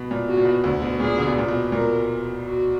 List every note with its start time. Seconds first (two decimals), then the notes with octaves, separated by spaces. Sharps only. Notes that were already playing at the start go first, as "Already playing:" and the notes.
Already playing: B2
0.11 A#2
0.28 B2 F#4
0.37 A#2
0.45 B2
0.64 D2 D3
0.82 B2
1.00 A#2 G#4
1.18 D3
1.28 B2
1.38 A#2
1.48 B2
1.72 A#2 A#4
2.45 F#4